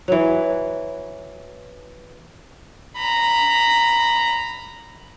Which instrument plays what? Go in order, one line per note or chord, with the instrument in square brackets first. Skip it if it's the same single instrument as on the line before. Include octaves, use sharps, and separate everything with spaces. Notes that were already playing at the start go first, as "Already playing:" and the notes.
[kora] E3 F#3
[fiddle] A#5 B5